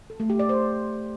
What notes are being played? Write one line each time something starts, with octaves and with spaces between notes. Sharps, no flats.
A4
A3
G4
D5
C5